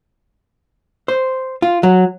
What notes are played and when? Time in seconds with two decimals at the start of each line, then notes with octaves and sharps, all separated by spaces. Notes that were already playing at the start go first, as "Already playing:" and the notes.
1.08 C5
1.62 F4
1.83 F#3